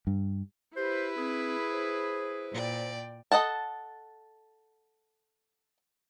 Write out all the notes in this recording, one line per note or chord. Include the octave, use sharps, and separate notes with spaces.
G2
E4 G4 B4 C5
C4 G#4
C5
A#2 D5 G5
A4 D#5 F#5 A5